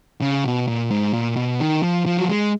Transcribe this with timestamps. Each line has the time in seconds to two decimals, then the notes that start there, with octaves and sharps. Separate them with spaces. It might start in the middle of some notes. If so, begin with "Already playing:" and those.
0.21 C#3
0.44 B2
0.68 A#2
0.91 G#2
1.13 A#2
1.36 B2
1.60 D#3
1.83 F3
2.06 F3
2.17 F#3
2.29 G#3